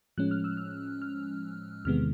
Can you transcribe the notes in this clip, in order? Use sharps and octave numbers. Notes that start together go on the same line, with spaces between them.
A2 F3 G#3 C#4 F#6
F6
E6
F6
F6
E2 C3 D#3 G#3 B3 F6